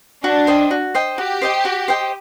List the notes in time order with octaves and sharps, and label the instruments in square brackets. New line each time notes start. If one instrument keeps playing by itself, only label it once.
[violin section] D4 [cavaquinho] F#4
[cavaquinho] C5 D#5 G5
F#4
C5 D#5 G5
[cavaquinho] F#4 [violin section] G4
[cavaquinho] C5 D#5 G5
F#4
C5 D#5 G5